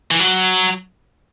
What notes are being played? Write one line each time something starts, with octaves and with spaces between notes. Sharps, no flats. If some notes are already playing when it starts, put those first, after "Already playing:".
E3
F#3